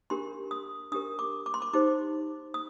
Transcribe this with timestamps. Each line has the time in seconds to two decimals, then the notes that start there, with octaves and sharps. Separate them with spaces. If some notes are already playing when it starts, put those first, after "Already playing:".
0.10 D4 G4 A#4 C6
0.51 D#6
0.92 D4 G4 A#4 D#6
1.19 D6
1.46 D6
1.54 C6
1.62 D6
1.73 D#4 G4 C5 D6
2.54 D#6